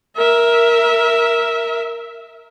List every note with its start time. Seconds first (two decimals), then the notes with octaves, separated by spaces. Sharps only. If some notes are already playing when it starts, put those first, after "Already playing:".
0.17 A#4 E5